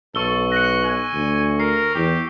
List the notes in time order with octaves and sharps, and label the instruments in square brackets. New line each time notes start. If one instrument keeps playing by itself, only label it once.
[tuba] B1 [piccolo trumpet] A4 [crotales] C#6 E6 G7
[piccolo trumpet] F#6 [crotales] A#6 C#7
[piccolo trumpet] G#5
[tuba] D2
[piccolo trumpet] A#4 [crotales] C7
[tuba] E2 [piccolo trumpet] G4